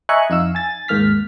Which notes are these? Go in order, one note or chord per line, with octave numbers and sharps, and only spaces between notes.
D#5 E5 G#5 A#5 C#6 F#6
F2 D#4 F5 E6
G#5 A6
D#2 G#2 A#3 F6 B6